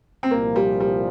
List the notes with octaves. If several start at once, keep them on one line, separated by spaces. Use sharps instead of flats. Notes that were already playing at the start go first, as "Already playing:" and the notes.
C4
C2 A#2 F3 A#3
G3
G3